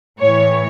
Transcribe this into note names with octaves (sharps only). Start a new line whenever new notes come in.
A2 E3 C#5